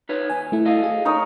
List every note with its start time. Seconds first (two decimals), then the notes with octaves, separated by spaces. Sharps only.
0.09 D#4 B4 C#5
0.30 D#2 G#5
0.52 A3 E4
0.65 A4 D#5 F5
0.84 G#4
1.05 D#4 A#4 C#5 D#5